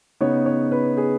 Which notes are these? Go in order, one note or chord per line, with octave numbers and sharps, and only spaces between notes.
C#3 B3 D#4 C#5
C#5
B4
G#4